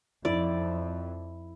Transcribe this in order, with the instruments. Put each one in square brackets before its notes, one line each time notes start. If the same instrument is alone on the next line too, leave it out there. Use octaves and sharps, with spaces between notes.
[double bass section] F2 [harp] E4 [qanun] D5